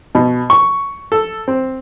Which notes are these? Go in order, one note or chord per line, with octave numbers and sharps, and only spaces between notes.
B2
C#6
A4
C4